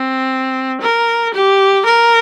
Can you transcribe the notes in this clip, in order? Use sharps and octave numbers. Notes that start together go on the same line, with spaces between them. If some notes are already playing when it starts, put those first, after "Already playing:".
Already playing: C4
A#4
G4
A#4